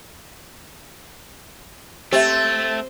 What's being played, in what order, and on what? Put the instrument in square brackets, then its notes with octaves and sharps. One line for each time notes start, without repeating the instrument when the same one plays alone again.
[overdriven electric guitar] A3 [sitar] C4 [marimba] G4 E5 [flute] A6